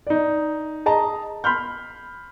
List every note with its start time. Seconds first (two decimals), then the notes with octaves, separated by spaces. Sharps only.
0.07 D#4 D5
0.86 G#4 D#5 A5 A#5
1.44 B5 C6 F6 G6